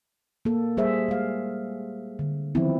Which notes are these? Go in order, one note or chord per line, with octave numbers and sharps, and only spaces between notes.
A#3 A4
G3 G#4 C5 E5
G#3 F5
D3
D#3 F3 F#3 B3 C4 E4